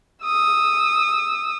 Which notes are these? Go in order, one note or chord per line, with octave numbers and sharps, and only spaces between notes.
D#6 E6